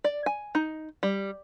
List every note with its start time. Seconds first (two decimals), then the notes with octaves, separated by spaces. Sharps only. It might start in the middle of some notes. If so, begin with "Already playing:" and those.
0.04 D5
0.26 G#5
0.55 D#4
1.03 G3